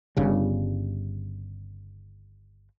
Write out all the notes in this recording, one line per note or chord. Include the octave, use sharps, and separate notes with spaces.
G1 G2 C#3